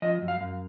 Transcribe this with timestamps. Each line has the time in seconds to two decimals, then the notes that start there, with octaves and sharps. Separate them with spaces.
0.02 F3 D#5
0.22 F#2
0.28 F5
0.41 F#2